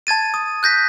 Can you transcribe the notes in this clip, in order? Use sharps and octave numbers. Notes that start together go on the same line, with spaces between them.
A5 G#6 A6 D#7
D#6
F#6 G6 A#6 B6